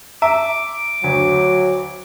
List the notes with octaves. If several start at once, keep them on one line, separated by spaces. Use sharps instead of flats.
E5 A#5 D6
D2 F#3